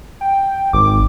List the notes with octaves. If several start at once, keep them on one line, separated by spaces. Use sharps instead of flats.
G5
G#1 D6